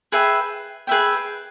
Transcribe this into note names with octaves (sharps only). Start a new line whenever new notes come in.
G#4 B4 E5 G5
G#4 B4 E5 G5